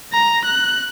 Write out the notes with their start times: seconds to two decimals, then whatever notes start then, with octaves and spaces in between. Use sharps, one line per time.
0.13 A#5
0.45 F#6